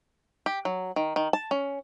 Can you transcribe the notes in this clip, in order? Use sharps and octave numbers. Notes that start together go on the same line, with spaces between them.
G4
F#3
D#3
D#3
A5
C#4